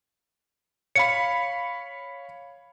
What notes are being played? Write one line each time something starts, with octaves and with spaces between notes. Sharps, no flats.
C#5 F5 B5 C#7